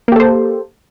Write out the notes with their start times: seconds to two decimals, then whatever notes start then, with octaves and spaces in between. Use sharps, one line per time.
0.08 A#3
0.12 G4
0.16 A4
0.20 C5